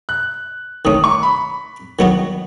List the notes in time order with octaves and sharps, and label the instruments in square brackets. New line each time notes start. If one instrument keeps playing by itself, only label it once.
[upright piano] F#6
[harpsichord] D#3 A3 C#4 [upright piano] D#6
[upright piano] C#6
B5
[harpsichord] D#3 F#3 B3 D#4 F#4